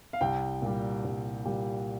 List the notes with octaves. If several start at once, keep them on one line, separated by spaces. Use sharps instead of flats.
F5
C2 G5
A#2 G3
C2
A#2 G3